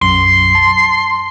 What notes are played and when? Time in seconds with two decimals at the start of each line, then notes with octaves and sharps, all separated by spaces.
0.01 B1 F#2 C6
0.55 A5